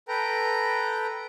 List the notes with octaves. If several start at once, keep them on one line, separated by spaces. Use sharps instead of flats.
A4 B4 G5 A#5